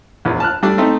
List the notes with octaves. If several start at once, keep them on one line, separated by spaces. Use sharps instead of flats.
A#1 E2
A5 F6 F#6
G3 A3 D4
A3 C4 D#4